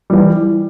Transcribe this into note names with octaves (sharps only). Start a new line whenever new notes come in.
E3 G3